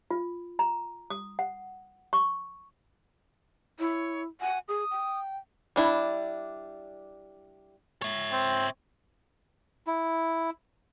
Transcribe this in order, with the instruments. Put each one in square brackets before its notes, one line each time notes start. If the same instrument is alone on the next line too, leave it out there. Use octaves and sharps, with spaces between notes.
[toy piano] F4
A#5
D#6
F#5
C#6
[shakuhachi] E4 [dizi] C#5
[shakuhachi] F#5 [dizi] G#5
[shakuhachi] G#4 [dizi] D#6
[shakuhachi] G5
[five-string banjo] G3 D4 E4
[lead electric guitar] C#5 E5
[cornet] C4
[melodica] E4